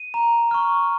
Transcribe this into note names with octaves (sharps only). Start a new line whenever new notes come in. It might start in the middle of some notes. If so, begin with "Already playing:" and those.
Already playing: D#7
A#5
C#6 F6